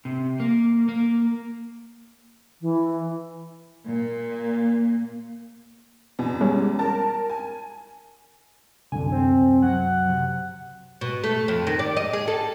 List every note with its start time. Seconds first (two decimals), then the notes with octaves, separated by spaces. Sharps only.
0.05 C3
0.40 A#3
0.89 A#3
2.61 E3
3.86 A#2 A#3
6.19 E2 B2
6.41 G3 G#3 C#4
6.79 A#4 A5
7.30 G#5
8.92 C2 F#2 D3 G#5
9.12 C4
9.62 F#3 F#5
10.09 C3
11.01 B2
11.24 A3
11.48 F2
11.67 D#3
11.79 D5
11.97 D#5
12.13 G#4
12.28 A4